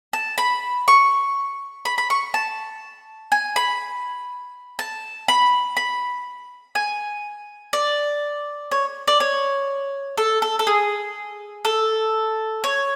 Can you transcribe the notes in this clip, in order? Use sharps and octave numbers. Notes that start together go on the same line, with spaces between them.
A5
B5
C#6
B5
B5
C#6
A5
G#5
B5
A5
B5
B5
G#5
D5
C#5
D5
C#5
A4
A4
A4
G#4
A4
C#5